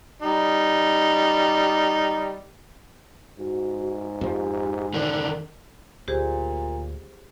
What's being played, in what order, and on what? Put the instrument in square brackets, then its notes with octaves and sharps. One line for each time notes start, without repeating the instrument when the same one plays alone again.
[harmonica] G3 D#4
[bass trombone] G#2 [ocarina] F#4
[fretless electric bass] F2 F3 [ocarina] G4
[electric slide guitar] D3 D#3 D4 [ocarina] A#4
[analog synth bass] D2 [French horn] A#2 [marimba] G4 G#4 C5